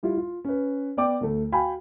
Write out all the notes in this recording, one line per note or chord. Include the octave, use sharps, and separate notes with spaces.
G3 E4 F4
F4
C#4 B4
B3 D5 G5 D6
D2 A3
F#4 F5 G5 G#5 B5